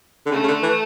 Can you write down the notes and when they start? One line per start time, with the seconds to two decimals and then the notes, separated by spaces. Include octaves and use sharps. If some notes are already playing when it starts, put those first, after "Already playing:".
0.26 D3
0.31 C#3 A3
0.43 C#3
0.48 D3
0.63 E3